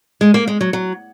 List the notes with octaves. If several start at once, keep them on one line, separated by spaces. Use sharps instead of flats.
G#3
A#3
G#3
F#3
F#3